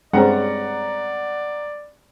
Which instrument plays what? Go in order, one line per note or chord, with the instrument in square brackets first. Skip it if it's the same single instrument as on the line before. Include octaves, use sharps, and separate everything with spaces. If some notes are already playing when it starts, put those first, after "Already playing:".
[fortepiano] G2 C#4 [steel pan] G#3 C4 [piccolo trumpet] D5 [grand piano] F#5 A#5